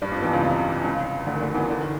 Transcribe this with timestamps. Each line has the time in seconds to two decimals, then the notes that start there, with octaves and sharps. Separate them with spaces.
0.02 G2 G3
0.12 F2 F3
0.22 E2 E3
0.33 C#2 C#3
0.44 C3
0.84 C#2 C#3
1.27 D2 D3
1.34 D#3
1.41 D2 D3
1.54 E2 E3
1.69 D3
1.81 D#3